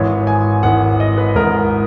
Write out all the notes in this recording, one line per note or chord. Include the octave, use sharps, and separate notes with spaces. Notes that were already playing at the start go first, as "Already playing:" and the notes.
Already playing: G#1 G#2 E3 C#5
G#5
G#1 G#2 E3 F#5
D#5
B4
G#1 G#2 E3 A#4